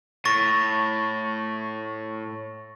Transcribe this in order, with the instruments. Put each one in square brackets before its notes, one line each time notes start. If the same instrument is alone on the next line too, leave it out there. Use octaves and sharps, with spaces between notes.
[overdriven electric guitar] A2 [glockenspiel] C#6 A6 A#6